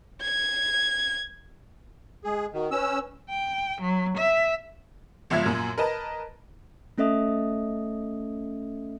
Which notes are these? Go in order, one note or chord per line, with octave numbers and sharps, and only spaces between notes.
G#6
G#3 G#4
D#3 F#4
C#4 B4 E6
G5
F#3
E5
G1 C#2 F3 E5 G#6
F#2 A#2
A#4 B4 D#5 A5
A3 C#4 A4 D#5 E5 D#6